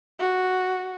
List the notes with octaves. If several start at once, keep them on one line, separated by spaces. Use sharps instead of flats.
F#4